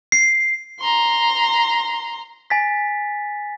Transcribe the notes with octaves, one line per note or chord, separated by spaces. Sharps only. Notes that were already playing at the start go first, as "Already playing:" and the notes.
C7
A#5 C6
G#5 A6 B6